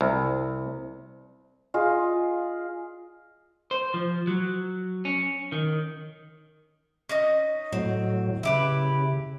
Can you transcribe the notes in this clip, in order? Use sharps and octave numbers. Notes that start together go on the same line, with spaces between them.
C2
F4 G#4 D#5
C5
F3
F#3
C#4
D#3
C#4 D#4 D#5
A2 F#3 C4
C#3 E4 G4 B4